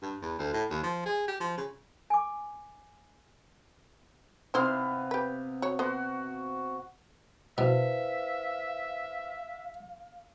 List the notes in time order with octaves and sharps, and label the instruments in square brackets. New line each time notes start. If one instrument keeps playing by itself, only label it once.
[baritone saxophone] G2
E2
D2
A2
D#2
F3
G#4
G4
F3
C#3
[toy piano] G#5 D6
[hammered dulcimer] C3 B3 F5 [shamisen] D#4 E4 C5
[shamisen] G4 B4
F#4 C#5
[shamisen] B3 C5 [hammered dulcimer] F#4
[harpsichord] B2 [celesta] E4 B4 C5 [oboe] E5 [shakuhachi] F5